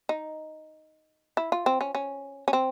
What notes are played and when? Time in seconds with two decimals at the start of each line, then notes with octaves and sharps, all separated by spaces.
0.09 D#4
1.37 E4
1.52 F4
1.66 C4
1.81 C#4
1.95 C#4
2.48 C#4
2.53 C4